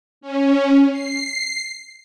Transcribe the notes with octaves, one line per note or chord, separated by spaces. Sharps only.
C#4
C7